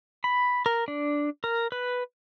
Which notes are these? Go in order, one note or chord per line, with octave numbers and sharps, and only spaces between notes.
B5
A#4
D4
A#4
B4